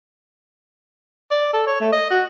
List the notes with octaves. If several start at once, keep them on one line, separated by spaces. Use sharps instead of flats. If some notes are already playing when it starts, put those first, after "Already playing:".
D5
A4
C#5
A3
D#5
F#4